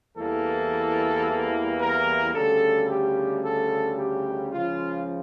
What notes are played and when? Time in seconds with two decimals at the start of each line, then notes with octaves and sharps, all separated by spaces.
0.16 E2 E3 G3 A#3 A4
1.79 A#4
2.34 D2 C#3 G3 A4
2.89 G4
3.43 A4
3.98 G4
4.52 C#2 C#3 F3 F4